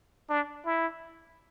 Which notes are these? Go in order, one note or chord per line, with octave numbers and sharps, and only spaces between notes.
D4
E4